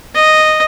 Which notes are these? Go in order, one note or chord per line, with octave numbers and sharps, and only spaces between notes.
D#5